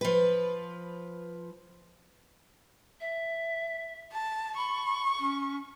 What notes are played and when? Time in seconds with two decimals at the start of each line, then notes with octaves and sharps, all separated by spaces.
0.01 F3 B4
3.00 E5
4.12 A5
4.57 B5 C#6
5.19 C#4